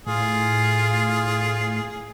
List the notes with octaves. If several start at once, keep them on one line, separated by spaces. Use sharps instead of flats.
A2 F4 G#4